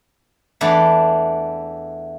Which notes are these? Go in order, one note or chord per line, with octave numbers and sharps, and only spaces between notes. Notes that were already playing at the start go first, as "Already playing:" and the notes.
E2 A3 D4 B4 A5